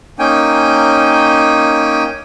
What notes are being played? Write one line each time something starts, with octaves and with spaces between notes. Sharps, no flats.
A#3 C#4 D#4 G5 G#5